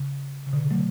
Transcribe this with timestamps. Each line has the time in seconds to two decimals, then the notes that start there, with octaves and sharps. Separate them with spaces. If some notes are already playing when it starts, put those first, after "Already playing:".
Already playing: C#3
0.46 C#3
0.53 B2 D3
0.70 F#3 A3